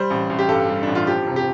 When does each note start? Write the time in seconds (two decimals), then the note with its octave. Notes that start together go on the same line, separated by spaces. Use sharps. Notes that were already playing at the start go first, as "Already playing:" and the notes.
Already playing: G3 C5
0.10 A1
0.30 A1
0.39 G4
0.48 G2 A4
0.69 G3
0.83 A1 D4
0.95 F4
1.07 F3 G4
1.27 F1
1.36 G4